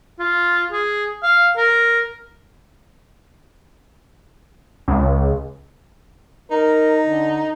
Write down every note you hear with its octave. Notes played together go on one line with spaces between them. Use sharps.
F4
G#4
F5
A#4
C#2
D#4 A#4
D3